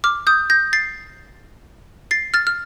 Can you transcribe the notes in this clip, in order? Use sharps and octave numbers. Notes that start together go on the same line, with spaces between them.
D6 F6
D#6 G6
G6 A#6
A6 C7
A6 C7
F6 A6
F6